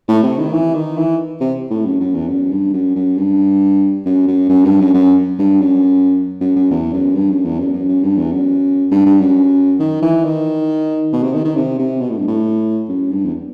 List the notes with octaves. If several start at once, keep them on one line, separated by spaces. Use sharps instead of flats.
A2
C3
D#3
E3
D#3
E3
C3
A2
F#2
F#2
E2
F#2
G2
F#2
F#2
G2
F#2
F#2
F#2
G2
F#2
F#2
G2
F#2
F#2
F#2
E2
F#2
G2
F#2
E2
F#2
F#2
F#2
G2
E2
F#2
G2
G2
F#2
D#3
E3
D#3
B2
C3
D#3
D#3
C3
C3
B2
A2
G2
A2
F#2
G2
E2